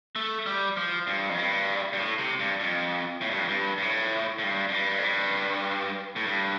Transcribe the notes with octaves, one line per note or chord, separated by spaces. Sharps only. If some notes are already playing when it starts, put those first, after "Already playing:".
A3
G3
F3
G2
F2
G2
G2
A2
C3
G2
F2
A2
G2
F2
G2
G2
A2
A2
G2
F2
G2
F2
G2
A2
G2